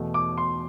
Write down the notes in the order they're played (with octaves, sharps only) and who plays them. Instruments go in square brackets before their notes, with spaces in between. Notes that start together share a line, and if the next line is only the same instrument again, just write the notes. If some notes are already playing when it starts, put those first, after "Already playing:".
Already playing: [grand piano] E2 B2 A3
D6
C6